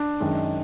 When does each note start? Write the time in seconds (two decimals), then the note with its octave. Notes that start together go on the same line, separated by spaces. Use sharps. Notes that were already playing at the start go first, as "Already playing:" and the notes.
Already playing: D4
0.20 F#2 D#3 G#3